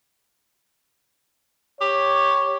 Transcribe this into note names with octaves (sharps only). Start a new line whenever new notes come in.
G4 C#5